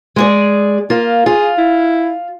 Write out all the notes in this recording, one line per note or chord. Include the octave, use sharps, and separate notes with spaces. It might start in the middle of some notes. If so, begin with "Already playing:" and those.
G#3 G#4 D5
A#3 F4
F4 G#4
E4